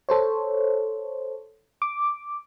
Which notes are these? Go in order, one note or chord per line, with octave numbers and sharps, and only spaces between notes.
A4 C5 C#5
D6